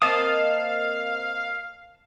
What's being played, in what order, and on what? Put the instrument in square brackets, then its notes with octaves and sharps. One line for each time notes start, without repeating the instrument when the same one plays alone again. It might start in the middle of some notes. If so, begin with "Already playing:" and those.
[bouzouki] A#3 C4 D#5 [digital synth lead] F5 [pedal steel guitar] A5 D#6